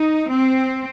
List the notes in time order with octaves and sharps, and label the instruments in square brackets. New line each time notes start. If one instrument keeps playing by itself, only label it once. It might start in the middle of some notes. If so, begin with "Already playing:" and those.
Already playing: [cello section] D#4
C4